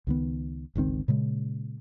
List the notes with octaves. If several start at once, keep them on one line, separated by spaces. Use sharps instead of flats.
C#2 D#3 B3
G1 C#2 D#3 C4
A#2 C#3 G#3